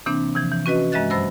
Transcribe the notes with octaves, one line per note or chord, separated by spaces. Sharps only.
C3 E3 A#3 C4 D4
C3 E3 F3
E3
C#4 F#4 B4 D#5
G2 G#3 D#5 E5 F#6 A6
F#2 F#3 C5 B5 E6 A#6